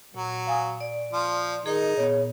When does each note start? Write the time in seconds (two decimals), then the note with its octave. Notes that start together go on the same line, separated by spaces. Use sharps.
0.14 A#2 F#3
0.47 F5 G#5 D#6
0.81 D5
1.13 F3
1.66 D#3 D#4 G#4
1.97 A#2 B3 C#5